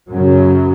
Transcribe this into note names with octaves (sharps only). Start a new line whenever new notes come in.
F#2 C#3 F#3